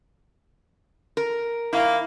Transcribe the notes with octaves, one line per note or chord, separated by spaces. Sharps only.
A#4
D#3 A#3 E4